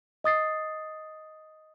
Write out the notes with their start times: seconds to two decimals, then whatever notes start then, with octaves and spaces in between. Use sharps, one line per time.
0.24 D#5 D#6 A6 C7